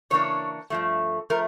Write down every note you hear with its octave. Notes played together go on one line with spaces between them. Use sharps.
C#3 E3 A#3 D4 C#5
G2 F3 A3
F3 A3 A#4